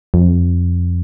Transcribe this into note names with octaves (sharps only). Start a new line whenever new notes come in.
F2